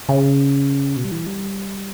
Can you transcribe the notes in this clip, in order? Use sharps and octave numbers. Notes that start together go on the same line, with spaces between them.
C#3
B2
G3
E3
G3